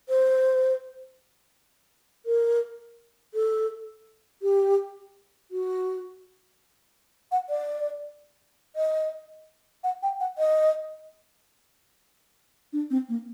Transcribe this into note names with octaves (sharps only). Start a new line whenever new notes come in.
C5
A#4
A4
G4
F#4
F#5
D5
D#5
F#5
G5
F#5
D#5
D4
C4
A#3